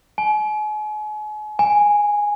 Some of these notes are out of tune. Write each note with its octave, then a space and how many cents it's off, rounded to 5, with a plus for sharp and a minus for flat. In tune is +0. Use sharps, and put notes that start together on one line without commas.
G#5 +40
G#5 -5